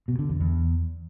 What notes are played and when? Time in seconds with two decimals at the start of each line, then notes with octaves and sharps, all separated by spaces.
0.08 B2
0.19 D3
0.29 E2
0.40 E2